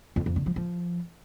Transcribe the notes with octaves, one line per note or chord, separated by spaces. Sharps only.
F2
F2
D3
F3
F3